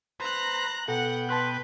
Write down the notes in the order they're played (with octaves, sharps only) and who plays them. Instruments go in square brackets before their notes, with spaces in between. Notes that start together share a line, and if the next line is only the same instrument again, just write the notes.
[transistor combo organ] B4 C5 [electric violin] A#5 F#6
[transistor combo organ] B2 G5 [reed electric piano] A4 [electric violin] F#5
[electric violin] B4 [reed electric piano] A5 C6 F#6